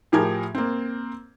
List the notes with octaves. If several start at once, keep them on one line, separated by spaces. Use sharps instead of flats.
A2 F3 G4 G#4 A#4 G#6
A#3 C4